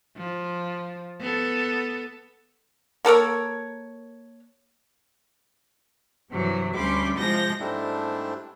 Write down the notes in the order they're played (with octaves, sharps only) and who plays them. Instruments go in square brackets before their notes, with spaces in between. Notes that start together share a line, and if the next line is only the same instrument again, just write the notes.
[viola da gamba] F3
B3 A4
[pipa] A#3 A4 A#4 C#5
[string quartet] G2 C3 E3 F#3
D2 G3 C#4 B5 C6 D6
C3 F3 G#3 G6 A#6
[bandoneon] G#2 G3 A3 C4 D4 E4